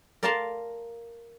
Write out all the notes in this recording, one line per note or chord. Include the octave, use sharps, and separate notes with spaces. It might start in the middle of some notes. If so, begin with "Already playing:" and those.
A#4 D5 F5 A5 A#5 C6